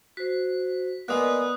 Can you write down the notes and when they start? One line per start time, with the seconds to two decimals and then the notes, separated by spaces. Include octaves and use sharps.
0.17 F#4 C5 B6
1.08 G#3 A#3 B3 D5 D#6 F#6